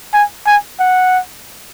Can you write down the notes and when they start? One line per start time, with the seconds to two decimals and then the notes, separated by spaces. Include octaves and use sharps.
0.14 G#5
0.47 G#5
0.80 F#5